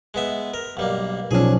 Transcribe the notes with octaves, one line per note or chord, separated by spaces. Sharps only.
G#3 B3 E5
A#4
B1 G3 A#3
B1 F3 C#4 D4 G#4